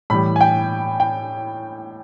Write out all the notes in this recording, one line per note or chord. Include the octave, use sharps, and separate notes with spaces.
A2 E3 G3 B5
G#5
G5
G5